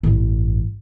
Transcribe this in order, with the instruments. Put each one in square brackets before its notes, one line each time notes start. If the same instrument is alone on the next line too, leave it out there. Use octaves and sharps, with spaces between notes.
[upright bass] A1 G2